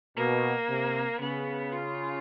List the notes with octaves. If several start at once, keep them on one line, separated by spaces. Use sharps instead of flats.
B2 A#3
C3
C#3 B3
F4